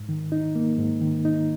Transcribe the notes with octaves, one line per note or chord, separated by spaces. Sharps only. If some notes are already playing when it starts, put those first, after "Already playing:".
Already playing: G#2
D#3
D#4
A#3
G#2
D#3
D#4